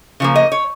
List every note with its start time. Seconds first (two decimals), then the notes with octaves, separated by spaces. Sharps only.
0.20 C#3 F3 A#3
0.36 D#5
0.52 C#5